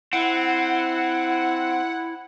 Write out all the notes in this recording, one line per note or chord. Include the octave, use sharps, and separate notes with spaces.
C4 E4 F#5